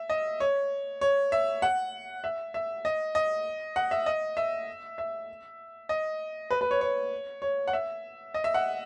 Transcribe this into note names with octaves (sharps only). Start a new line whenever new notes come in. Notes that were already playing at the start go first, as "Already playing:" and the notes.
Already playing: E5
D#5
C#5
C#5
E5
F#5
E5
E5
D#5
D#5
F#5
E5
D#5
E5
E5
D#5
B4
B4
C#5
C#5
C#5
F#5
E5
D#5
E5
F#5